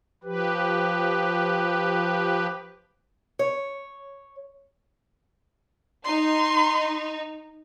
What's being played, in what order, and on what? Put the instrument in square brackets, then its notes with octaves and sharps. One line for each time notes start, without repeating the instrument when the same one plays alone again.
[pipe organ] F3 G4 B4
[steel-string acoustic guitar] C#5
[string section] D#4 [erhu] C6